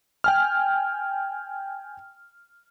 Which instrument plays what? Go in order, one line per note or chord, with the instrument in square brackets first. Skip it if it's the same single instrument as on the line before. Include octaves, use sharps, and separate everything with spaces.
[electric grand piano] G5 G#5 F6